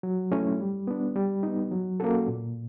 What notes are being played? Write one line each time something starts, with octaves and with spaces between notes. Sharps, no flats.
F#3
A3 C#4 E4
G3
B3 D4
G3
B3 D#4
F#3
A#3 C#4 F#4 A4
A#2